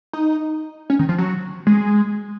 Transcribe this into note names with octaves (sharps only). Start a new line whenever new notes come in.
D#4
C#4
D#3
F3
F#3
G#3